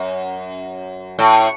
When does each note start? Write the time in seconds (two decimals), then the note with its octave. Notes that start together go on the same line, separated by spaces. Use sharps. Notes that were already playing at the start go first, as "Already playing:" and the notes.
Already playing: F#2
1.19 A2